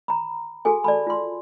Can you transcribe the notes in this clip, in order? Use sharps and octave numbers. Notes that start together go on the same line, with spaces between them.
A#5 B5
F#4 G#4 A4 G#5
D5 A5 B5
F4 C6